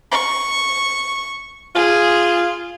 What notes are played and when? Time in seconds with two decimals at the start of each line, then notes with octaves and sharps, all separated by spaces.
0.12 C#6
1.75 F4 G#4